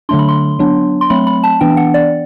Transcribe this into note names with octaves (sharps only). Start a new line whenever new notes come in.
D3 F#3 A3 D4 C6
B5
C6
F#3 B3 D4
C6
F#3 A3 C4 B5
B5
A5
E3 B3 D4 G5
F#5
D5